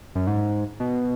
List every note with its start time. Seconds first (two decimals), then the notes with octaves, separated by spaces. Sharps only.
0.15 F#2
0.27 G#2
0.80 B2